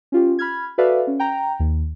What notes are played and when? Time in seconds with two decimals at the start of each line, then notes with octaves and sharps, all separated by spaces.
0.12 C#4 F4 G4
0.39 B5 F6 G#6
0.78 F#4 A4 B4 D5 E5 F5
1.07 C#4
1.19 G5 A#5
1.60 D#2